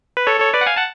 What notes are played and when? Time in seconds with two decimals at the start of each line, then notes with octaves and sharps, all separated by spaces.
0.17 B4
0.27 A4 C#5
0.40 A4 C#5
0.54 B4 D5
0.61 F#5
0.66 F5 G#5
0.76 F#5 A5